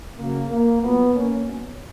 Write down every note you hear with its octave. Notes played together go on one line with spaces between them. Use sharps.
C#3 F#3 A#3
A#3
A#2 F#3 B3
A#3 C#4
B2 F#3